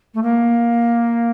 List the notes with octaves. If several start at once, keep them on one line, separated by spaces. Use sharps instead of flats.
A3
A#3